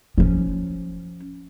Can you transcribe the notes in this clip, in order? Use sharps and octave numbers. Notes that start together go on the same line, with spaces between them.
F3 C#4